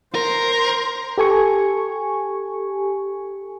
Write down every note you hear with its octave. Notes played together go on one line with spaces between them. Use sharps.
A#4 C5
G4 A4 G#5 C#6